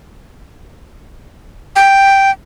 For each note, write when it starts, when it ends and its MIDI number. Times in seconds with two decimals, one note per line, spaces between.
1.76 2.31 79